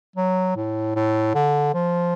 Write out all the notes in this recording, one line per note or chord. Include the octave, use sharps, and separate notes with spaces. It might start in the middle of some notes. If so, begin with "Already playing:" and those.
F#3
A2
A2
D3
F3